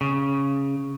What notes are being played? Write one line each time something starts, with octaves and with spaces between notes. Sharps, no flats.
C#3